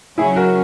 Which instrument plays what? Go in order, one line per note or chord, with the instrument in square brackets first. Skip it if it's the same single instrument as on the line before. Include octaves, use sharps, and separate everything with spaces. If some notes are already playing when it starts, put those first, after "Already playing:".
[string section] C#3 F#3 C#4 [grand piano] E4 G#4
[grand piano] F#4 A#4